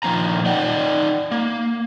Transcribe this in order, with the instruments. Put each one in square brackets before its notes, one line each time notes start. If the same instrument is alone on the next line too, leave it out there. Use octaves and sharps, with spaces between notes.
[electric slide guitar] A#2 D#3 F3 C4 A#5
D#4 D5 F#5 G5
A#3